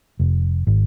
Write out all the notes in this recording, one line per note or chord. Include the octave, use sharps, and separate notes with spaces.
F1
G#1